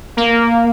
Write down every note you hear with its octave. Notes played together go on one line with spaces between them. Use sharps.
A#3